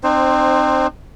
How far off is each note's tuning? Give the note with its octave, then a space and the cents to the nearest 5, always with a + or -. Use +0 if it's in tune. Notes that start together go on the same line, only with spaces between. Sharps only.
C4 +0 D#4 -45 C5 +10